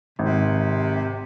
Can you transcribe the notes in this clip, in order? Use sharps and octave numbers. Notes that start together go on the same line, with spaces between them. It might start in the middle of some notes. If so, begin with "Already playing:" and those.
G#1 C3